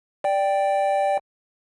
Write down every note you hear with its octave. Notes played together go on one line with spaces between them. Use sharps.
D5 G5